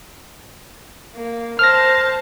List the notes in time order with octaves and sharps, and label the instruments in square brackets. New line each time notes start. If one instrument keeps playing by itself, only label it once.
[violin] A#3
[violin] C5 A5 [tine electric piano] F6 A#6